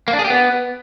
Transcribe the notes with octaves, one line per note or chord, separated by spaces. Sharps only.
A#3
D4
G#4
G4
B3